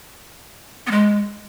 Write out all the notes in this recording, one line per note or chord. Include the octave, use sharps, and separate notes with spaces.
B3
G#3